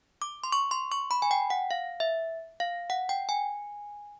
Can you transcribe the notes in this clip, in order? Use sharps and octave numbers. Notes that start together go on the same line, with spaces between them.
D6
C6
C#6
C6
C#6
B5
G#5
G5
F#5
F5
E5
F5
F#5
G5
G#5